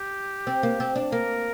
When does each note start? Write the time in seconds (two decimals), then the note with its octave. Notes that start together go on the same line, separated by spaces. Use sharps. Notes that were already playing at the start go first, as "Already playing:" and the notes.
Already playing: G4
0.47 C4
0.63 A#3
0.80 C4
0.96 D4
1.12 A#3 A#4